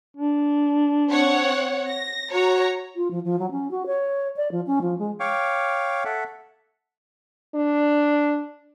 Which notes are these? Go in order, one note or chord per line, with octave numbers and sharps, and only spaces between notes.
D4
C4 C#5 F#5
A#6
F#4 C#5 A#5
F4
F3
F3
F#3
C#4
F#4
C#5
D5
F3
C#4
F3
G#3
C#5 F5 G5 C#6 D6
A4 E5 F#5
D4